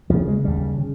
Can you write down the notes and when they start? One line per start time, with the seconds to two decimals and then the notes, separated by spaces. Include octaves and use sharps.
0.10 D#2 C#3 F3
0.28 G#3
0.44 D#2 C#3 G3
0.78 C#3